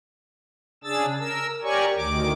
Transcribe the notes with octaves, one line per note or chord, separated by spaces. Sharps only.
C#3 D4 G#4 E6 A6
A#4 E6
G4 A#4 C#5 D5 G#5 C#6
D2 D#3 D6